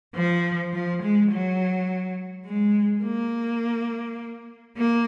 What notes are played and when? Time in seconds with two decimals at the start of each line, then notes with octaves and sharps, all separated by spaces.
0.15 F3
0.73 F3
1.02 G#3
1.31 F#3
2.46 G#3
3.04 A#3
4.77 A#3